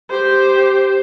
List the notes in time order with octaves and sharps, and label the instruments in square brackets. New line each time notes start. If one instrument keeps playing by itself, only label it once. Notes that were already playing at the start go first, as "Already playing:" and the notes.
[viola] G4 C5